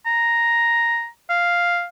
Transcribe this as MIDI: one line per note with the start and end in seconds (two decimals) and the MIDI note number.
0.06 1.07 82
1.30 1.85 77